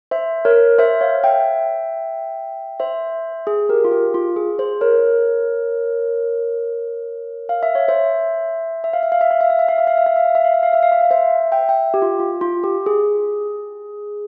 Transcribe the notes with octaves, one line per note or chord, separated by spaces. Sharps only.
C5 E5
A#4 C#5
C5 E5
C#5 F5
E5 G5
C5 E5
G#4
G4 A#4
F4
G4
F4
G#4
G#4 C5
A#4 C#5
F5
E5
C#5
C5 E5
E5
F5
E5
F5
E5
F5
E5
F5
E5
F5
E5
F5
E5
F5
E5
F5
E5
F5
E5
F5
E5
F5
E5
F5
C5 E5
E5 G5
E5 G5
G4
F4
F4
F4
G4
G#4